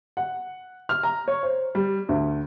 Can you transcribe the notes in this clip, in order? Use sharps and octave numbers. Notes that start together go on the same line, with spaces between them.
F#5
F6
A#5
C#5
C5
G3
D2